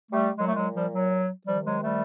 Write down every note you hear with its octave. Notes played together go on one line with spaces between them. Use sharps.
G3 A3
A#2 F#3 G#3
A3
F#3 G#3
F3 G3
F#3
C3 D#3 F3 G3
F#3 G#3
G3 A3